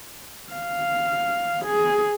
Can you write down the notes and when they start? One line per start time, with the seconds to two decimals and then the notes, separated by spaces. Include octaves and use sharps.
0.52 F5
1.66 G#4